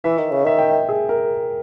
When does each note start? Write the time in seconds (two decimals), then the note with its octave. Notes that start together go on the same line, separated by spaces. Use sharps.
0.04 E3 E5
0.18 D#3
0.32 C#3
0.45 D#3 E5
0.59 G5
0.71 E5
0.89 G#4
1.09 A#4